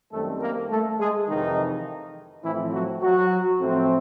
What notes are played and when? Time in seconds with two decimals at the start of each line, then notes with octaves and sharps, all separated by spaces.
0.12 F#2 D#3 G3 A3 C4 A4
0.41 A#3 A#4
0.70 A3 A4
0.99 G#3 G#4
1.28 F2 C3 D#3 E3 G#3 D#4
2.44 A2 E3 F3 A3 C4 E4
2.73 F#3 F#4
3.02 F#3 F#4
3.60 A2 F3 A3 C4